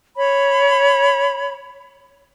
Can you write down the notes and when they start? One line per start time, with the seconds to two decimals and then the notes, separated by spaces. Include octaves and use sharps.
0.16 C#5 B5